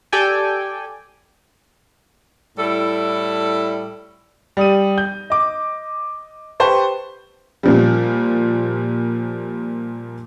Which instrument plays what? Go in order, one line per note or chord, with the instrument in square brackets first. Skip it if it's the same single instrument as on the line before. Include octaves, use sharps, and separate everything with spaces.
[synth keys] G4 A4 D5 G5 G#5
[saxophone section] A2 G3 E4 A4
[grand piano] G3 D#6 D#7
G6
D#5 D6
G4 B4 C5 A5 C#6
[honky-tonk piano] A#2 F3 G3